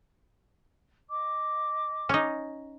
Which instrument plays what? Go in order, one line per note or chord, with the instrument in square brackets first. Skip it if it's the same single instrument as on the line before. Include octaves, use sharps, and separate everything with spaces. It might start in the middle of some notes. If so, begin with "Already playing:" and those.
[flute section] D#5 D6
[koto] C#4 D#4